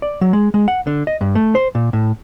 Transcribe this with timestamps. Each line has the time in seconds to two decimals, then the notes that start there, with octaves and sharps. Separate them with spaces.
0.02 D5
0.21 F#3
0.33 G#3
0.54 G#3
0.68 F#5
0.87 D3
1.07 D#5
1.21 G2
1.35 A3
1.55 C5
1.75 A#2
1.93 A2